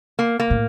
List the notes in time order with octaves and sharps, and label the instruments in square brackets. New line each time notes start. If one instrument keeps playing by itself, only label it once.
[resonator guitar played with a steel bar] A#3
A#3
[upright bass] A2